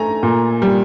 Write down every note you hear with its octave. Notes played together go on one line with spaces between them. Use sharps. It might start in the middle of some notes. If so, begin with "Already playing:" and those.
Already playing: A3 G#5 A#5
A#2
G3